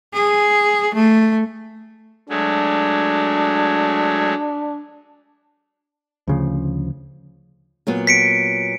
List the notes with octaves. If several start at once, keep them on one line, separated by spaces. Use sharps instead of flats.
G#4
A3
F#3 G#3 A3 D4
D2 C#3 F3
A#2 F#3 B3
B6 C#7 D7